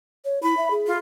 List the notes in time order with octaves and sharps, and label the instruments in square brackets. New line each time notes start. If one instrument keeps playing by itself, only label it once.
[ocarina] C#5
[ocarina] E4 [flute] B5
[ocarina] E5
G#4
[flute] F4